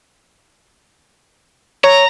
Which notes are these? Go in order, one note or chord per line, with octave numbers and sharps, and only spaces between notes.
C#5 A#5